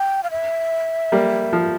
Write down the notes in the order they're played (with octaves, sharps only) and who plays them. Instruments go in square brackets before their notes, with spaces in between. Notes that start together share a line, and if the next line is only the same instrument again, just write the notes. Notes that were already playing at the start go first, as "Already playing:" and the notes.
Already playing: [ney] G5
F5
E5
[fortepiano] G3 A#3
F3